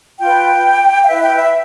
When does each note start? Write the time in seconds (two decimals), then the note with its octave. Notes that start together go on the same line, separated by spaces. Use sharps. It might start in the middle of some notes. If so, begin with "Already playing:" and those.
0.19 F4 B4 G5
1.02 F5
1.06 E4 B4 E5
1.22 G5
1.36 E5